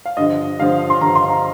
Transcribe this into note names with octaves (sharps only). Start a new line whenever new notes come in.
F5
G2 D3 F3 D#5
G2 D3 F3 F5
C6
G2 D3 F3 A#5
C6
A#5